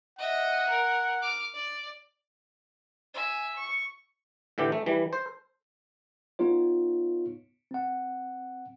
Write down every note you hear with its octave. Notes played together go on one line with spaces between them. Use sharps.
D#5 E5 F#5
A#4
D6 F6
D5
E5 G#5
C#6
A2 D3 E3 G4
A3
E3 G3
C5
B3 D#4 F4 C#5
C4 F#5